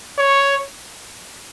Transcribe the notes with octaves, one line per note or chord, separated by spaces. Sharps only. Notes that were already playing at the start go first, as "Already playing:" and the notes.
C#5